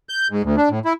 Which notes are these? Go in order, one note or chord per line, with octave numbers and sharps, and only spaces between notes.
G6
G#2
D2
D4
A2
E4